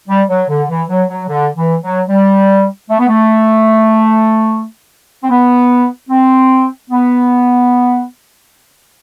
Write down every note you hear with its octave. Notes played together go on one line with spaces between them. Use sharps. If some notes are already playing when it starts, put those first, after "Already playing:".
G3
F#3
D3
E3
F#3
F#3
D3
E3
F#3
G3
A3
B3
A3
C4
B3
C4
B3